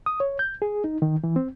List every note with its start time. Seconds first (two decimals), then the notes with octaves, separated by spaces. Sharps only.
0.06 D#6
0.20 C#5
0.39 G6
0.62 G#4
0.84 D#4
1.02 D#3
1.24 E3
1.36 C4